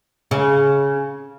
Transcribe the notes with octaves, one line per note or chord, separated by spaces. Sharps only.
C#3